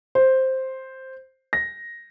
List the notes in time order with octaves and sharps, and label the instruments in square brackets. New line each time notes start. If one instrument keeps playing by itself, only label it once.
[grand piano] C5
A#6